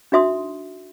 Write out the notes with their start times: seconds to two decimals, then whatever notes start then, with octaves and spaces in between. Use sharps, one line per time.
0.12 D4 D#4 F#4 E5 C6 D#6